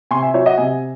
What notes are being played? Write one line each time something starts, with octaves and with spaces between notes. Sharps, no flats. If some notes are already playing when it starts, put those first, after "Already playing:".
C3 G#5 C6
E5 G#5
F#3 C#5 E5
D#5 F#5
C3 E5 G#5